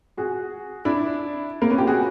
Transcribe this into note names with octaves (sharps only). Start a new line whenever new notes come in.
F#4 G#4
D4 E4
A#3 C4
B3 C#4
F4 G4
F#4 G#4